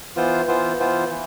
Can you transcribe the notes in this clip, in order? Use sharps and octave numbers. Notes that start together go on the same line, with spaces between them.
E3 B3 F4 C5
E3 B3 F4 C5
E3 B3 F4 C5
E3